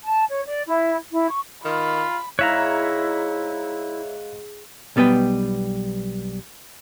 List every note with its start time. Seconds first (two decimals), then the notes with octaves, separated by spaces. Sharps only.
0.03 A5
0.29 C#5
0.46 D5
0.67 E4
1.11 E4
1.29 C#6
1.65 D#3 F4 B5
2.39 G#2 E4 C#5 E5 F5 A#5 F#6
4.96 B1 G3 B3 B4 G5